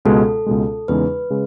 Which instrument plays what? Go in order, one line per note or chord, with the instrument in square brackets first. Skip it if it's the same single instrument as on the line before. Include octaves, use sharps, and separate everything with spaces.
[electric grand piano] C#2 B2 G#3 [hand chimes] A4
[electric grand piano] C#2 B2 G#3
[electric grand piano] E2 C#3 G#3 D#4 [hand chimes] B4
[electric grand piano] C#3 G#3